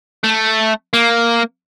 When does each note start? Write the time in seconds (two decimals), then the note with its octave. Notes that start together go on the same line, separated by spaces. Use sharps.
0.24 A3
0.93 A#3